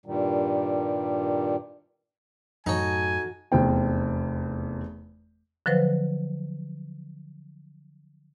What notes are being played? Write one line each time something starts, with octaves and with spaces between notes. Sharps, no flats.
G2 A#2 D#3 G3
F#2 A2 D#4 F#4 A4 C#5 G#5
F1 E2 C4 G5
D3 F3 F#3 B4 C5